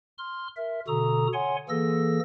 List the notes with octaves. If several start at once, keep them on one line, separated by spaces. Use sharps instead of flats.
C6 F6
A#4 E5
B2 D3 F#4 A4 A#5 D#6
C#5 F#5 G#5 C6
E3 A#3 G#4 A4 E6 A#6